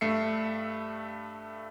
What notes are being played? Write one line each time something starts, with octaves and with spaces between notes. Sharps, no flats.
G2 A3 E5 C7 C#7